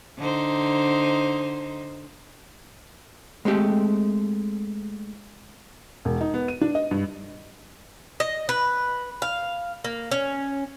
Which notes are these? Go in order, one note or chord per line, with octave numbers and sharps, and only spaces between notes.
D3 D#4 C5
G#3 A3 C4 G4 A4
E1
D#4
B3
D#7
D4
D#5
G2
D#5
B4
F5
A#3
C#4